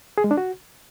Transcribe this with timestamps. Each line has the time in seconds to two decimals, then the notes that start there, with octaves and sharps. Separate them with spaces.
0.18 G#4
0.24 G#3
0.31 D4
0.37 F#4